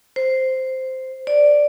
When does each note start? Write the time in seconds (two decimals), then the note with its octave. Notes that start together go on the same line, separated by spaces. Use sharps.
0.16 C5
1.27 D5